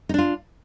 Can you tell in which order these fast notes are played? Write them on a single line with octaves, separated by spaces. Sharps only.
D#4 D4 F4